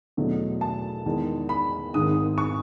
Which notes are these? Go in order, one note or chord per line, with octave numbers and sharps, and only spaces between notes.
E2 B2 F#3 A3
A5
E2 D#3 G#3
B5
G#1 G#2 D#3 G#3 D#6
C#6